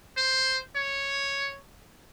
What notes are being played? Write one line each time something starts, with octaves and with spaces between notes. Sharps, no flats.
C5
C#5